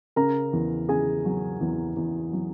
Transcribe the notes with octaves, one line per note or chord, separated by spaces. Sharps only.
C#3 A#4 A#5
E2
C#3 G#4 G#5
F#3
E2
E2
F#3